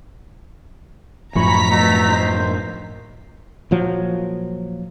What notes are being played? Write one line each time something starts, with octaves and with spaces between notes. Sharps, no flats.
F#2 A2 F3 G#5 A#5 B5 C#6 B6
B2 A3
D#3 C5
A#2 F3 F#3